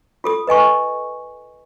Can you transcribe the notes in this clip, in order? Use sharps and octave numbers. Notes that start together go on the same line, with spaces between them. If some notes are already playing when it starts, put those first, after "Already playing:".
F4 A4 D#6
B4 D#5 G#5 C#6